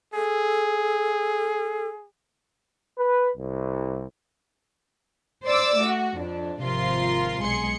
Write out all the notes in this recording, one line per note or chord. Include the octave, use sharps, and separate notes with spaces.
G#4 A4
B4
C2
C5 D5 D6 E6
A3 F#4
F2 D4
G#1 C3 F3 F4 A#4 C6
B1 G#3 G#4 C6 C#7